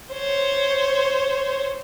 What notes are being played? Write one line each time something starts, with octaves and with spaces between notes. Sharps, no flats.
C5 C#5